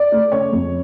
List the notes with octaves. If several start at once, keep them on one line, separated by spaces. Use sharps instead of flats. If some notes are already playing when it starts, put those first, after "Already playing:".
Already playing: D5
A3
C#3 C#5
F2